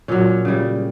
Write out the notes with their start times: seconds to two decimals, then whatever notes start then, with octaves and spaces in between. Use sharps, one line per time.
0.08 A#2 F#3 C#4
0.45 C#3 G3